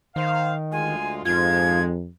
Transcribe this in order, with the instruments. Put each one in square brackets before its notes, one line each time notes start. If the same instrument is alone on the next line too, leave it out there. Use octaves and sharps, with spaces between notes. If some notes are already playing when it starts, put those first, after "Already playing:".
[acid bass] D#3 [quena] C5 [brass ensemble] F5
[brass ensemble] D2 G#3 F4 [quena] G#5
[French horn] F2 [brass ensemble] G#2 F3 G#3 [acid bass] F4 [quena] G#6